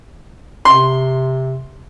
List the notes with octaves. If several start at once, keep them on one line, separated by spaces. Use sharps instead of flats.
C3 C6